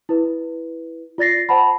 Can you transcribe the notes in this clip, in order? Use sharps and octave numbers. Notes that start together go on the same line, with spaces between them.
E4 B4
F4 D5 A6 A#6 C7
C5 F#5 A5 B5